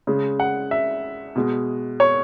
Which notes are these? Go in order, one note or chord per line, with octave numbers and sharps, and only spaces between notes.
C#3 G#3
F#5
E5
B2 G#3
C#5